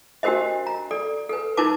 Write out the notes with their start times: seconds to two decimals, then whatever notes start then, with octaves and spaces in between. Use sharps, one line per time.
0.23 D4 F#4 G4 A#4 C5 D#5
0.67 A#5
0.91 A4 D5
1.29 A4 B4
1.57 D#4 E4 A#4 B4 A5 D6